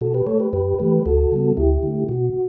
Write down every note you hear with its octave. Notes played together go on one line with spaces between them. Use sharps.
B2 F#4 A4
G4 B4
A3 A4 C#5
G4 B4
F#2 G4 B4
E3 A3 G4 B4
D2 F#4 A4
C#3 G3 B3
D2 E4 G4
D3 A3
B2 F#4